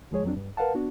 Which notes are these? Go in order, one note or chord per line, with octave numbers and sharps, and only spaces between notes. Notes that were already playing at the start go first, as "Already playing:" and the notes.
D2 F3 G#3 G#4 C#5
F2 F#3 C4 D4
G2
A#4 B4 F5 F#5 A5
B3 D4 F#4